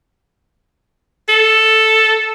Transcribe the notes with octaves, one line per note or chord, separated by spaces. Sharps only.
A4